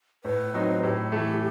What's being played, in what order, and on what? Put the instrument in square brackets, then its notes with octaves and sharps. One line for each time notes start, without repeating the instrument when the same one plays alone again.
[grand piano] A2 [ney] B4
[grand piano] F#3 C4 D#4
[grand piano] A2 [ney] G4
[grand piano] E3 A3